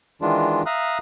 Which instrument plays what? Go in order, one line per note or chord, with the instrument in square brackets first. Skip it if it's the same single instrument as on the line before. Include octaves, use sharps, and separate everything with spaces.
[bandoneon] D#3 E3 G#3 D4 F4
E5 F5 A#5 D#6 F#6